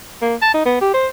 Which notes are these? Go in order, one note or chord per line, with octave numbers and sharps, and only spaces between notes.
A#3
A5
D#4
B3
G4
C5